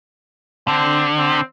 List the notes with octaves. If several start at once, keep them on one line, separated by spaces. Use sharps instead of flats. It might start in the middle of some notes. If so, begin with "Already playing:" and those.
D3 C4
C4